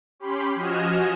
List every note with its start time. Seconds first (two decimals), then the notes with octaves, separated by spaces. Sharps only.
0.19 C#4 G4 B5 C6
0.55 F3 F#4 D#5 G#5 F6 E7